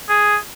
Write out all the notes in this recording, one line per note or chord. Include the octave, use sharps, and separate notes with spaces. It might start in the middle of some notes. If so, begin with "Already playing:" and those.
G#4